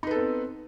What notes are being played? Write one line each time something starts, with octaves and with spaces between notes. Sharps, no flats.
B3 C4 D#4 A4 B4